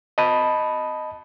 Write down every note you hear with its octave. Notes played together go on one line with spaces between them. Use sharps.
D#5 A5 B5